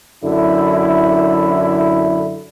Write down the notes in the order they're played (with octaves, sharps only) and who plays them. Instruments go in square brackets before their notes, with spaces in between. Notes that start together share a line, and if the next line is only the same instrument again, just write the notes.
[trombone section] F#2 D3 E4